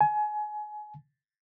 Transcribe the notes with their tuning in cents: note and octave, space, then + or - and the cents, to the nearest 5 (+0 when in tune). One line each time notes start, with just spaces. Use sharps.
G#5 +25